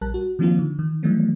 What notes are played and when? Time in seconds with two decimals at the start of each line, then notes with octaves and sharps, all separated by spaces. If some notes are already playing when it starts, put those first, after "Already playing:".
0.01 A#1 G3 A#4 A5 F#6
0.14 F#4
0.39 D#3 F3 A#3 C4 D#4 F4
0.59 D3
0.79 D#3
1.03 D#3 E3 F#3 G3 A3 B3